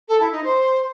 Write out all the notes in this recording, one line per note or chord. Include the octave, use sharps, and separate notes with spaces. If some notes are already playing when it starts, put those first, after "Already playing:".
A4
E4
D#4
C5